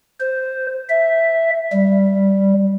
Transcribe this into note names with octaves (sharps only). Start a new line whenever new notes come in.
C5
E5
G3